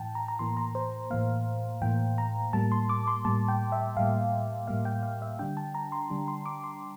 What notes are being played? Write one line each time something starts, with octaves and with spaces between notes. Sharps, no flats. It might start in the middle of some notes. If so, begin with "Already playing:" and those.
Already playing: A2 E3 G5 A5
A#5
A#5
A2 E3 A#3 C6
A#5
C5
A2 E3 A#3 F5
A2 E3 A#3 G5
A#5
A2 G3 A#3 A5
C6
D6
C6
A2 G3 A#3 A5
G5
E5
A2 G3 A#3 F5
A2 G3 A#3 F5
G5
F5
E5
D3 G3 D4 G5
A5
A#5
C6
D3 G3 D4
C6
D6
C6